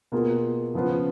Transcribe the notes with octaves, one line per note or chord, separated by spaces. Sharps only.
B2 A#3 F4 G#4
C#3 F3 B3 F4 B4